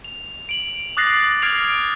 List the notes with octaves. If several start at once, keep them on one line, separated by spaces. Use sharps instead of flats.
F7
D7 F#7
D6 D#6 F#6 A6 A#6 C7
D6 F6 G#6 C7 D7 F7